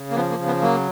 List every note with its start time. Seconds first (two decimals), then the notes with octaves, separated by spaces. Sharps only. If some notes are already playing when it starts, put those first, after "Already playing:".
Already playing: C#3
0.11 A#3
0.16 F3 B3
0.31 A#3
0.39 C#3
0.47 B3
0.62 F#3 A#3